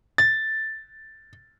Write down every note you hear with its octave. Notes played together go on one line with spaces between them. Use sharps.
A6